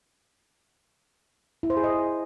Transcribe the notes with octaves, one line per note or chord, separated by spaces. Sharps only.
E4
C5
G#4
D#5